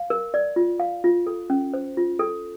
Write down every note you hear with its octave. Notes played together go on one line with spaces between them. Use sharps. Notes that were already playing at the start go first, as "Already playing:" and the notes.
Already playing: F5
A#4
D5
F4
F5
F4
A4
C#4
C5
F4
A4